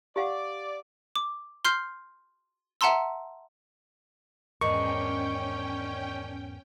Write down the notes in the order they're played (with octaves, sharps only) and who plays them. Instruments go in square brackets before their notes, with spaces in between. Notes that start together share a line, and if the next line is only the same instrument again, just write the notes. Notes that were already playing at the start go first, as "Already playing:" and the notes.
[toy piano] G4 F5 F#5 [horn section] D5
[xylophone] D6
C6 F6 G6 C7
E5 F#5 A5 A#5 C6 E6
[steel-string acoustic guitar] E2 G#2 A#4 [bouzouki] D#3 D4 [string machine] C#4 G5 [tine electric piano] C#6